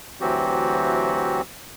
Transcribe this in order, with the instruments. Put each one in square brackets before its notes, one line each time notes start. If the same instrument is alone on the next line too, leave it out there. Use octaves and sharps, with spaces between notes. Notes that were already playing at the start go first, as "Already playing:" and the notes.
[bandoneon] D2 E3 F#3 C4 F#4 G4